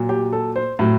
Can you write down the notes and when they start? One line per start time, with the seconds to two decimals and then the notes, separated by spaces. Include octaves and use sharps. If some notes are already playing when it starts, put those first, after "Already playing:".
Already playing: A#2 F#3
0.09 G4
0.33 A4
0.56 C5
0.79 A2 F#3